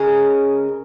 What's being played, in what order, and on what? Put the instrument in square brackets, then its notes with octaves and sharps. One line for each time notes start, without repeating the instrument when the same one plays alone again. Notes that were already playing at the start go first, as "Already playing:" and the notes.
Already playing: [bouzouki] C#3 G#3 C#4 A#4